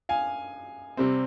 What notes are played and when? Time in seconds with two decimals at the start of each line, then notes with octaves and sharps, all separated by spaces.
0.09 F5 G#5
0.97 C3 G3 C4